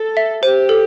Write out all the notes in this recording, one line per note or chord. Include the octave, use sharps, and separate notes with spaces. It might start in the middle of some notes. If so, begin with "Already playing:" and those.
Already playing: A4
E5
G4 C5
A4